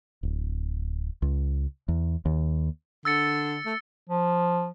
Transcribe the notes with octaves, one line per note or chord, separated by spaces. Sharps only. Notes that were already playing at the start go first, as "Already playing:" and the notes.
D1
C#2
E2
D#2
D3 E6 A6 C#7
A3
F3